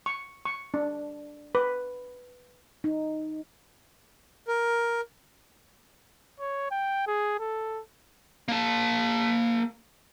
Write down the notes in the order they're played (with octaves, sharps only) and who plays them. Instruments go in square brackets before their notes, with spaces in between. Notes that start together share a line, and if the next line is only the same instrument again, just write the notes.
[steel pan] C#6
C#6
D4
B4
[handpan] D#4
[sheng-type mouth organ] A#4
[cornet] C#5
G5
G#4
A4
[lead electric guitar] A#3 A5